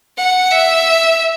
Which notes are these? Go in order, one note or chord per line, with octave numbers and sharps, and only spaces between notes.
F#5
E5